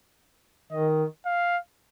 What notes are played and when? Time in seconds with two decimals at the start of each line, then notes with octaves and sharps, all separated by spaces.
0.71 D#3 D#5
1.25 F5